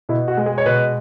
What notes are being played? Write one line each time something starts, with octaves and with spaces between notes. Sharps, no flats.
B2 E4
F#4
G#3
G#4
C#5
B2 B4